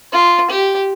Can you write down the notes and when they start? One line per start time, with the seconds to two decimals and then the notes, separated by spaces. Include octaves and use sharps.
0.12 F4
0.50 G4